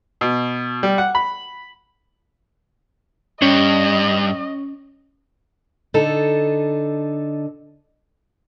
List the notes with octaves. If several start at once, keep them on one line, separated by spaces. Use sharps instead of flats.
B2
G3
F#5
B5
G2 C#4 D#5
D3 D#4 A4